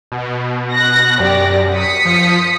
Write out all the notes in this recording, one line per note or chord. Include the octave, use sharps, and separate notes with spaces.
B2
F#6 A#6
F#2 G4 D5 A#6
D#6 B6 C#7
F3